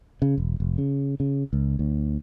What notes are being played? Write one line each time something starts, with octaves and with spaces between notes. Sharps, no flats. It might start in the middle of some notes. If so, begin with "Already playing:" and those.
C#3
E1
F1
C#3
C#3
C#2
D2